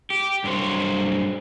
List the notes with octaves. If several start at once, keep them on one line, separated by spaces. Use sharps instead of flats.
G4
G2 F#3 C5 C#5